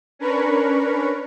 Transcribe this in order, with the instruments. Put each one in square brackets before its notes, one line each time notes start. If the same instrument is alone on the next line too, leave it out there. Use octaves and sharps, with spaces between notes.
[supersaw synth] C#4 D4 A#4 B4 B5 C#6